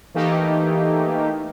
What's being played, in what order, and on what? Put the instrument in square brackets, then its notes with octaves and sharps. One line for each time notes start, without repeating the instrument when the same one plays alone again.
[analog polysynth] E3 A3 A#3 D#4 G4